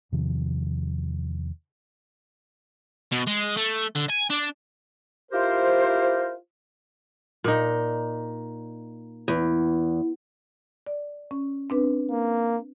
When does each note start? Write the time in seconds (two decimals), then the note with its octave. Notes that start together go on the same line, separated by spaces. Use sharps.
0.12 E2 C3 D#3 F3
3.12 B2
3.27 G#3
3.56 A3
3.95 D3
4.09 G#5
4.30 D4
5.32 E4 F4 G4 A#4 C5
7.44 A#2 D#4
9.28 E2
10.87 D5
11.31 C#4
11.70 C4 D4 B4
12.10 A#3